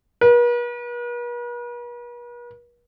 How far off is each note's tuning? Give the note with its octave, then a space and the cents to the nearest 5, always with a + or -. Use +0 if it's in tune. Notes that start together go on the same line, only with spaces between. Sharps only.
B4 -45